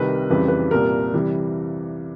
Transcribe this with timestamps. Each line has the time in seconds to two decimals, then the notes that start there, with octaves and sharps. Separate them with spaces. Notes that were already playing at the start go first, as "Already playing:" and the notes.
Already playing: C2 C3 D#3 G3 B4
0.30 F2 C#3 E3 G3 B4
0.48 B4
0.71 C2 A#2 G3 A#4
1.13 C3 E3 G3